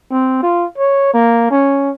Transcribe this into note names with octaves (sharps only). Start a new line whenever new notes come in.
C4
F4
C#5
A#3
C#4